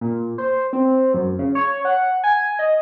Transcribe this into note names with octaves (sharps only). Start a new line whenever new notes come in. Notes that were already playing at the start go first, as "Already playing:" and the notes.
A#2
C5
C4
F#2
C#3
C#5
F#5
G#5
D#5